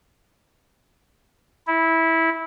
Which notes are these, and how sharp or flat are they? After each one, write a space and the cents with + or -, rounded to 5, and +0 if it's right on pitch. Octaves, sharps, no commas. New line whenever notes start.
E4 -15